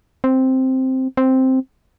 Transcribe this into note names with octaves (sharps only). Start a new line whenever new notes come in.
C4
C4